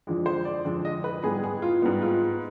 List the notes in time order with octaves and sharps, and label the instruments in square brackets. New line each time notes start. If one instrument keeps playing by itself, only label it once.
[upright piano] F2 D3 F3 G#3 D4
C5
D5
F2 D3 F3 G#3 D4
D#5
B4
G#2 G3 B3 G#4
G#4
F4
G#2 G3 B3
F4